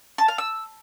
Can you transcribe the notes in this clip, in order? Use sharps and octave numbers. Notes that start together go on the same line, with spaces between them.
A5
F5
E6